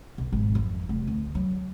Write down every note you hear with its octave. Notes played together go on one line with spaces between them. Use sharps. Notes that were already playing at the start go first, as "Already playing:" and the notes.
B1
G#1
F2
F1
D2
F#3